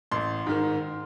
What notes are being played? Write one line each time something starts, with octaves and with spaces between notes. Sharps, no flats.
A1 C6
G#2 D#3